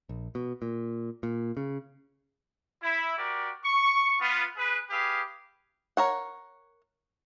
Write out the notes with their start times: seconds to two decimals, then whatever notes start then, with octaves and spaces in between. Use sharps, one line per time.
0.09 A#1
0.35 B2
0.62 A#2
1.23 A#2
1.57 C#3
2.82 E4
3.18 F#4 G4 A#4 D5
3.64 C#6
4.20 B3 F4
4.57 G#4 B4
4.90 G4 G#4 B4 F5
5.97 A#4 C#5 F#5